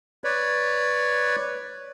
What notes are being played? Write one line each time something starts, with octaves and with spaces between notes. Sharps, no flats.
B4 C#5 D5